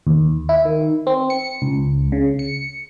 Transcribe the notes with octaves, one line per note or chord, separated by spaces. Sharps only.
D#2
E4
D#3
C4
C#7
C#2
C#3
C#7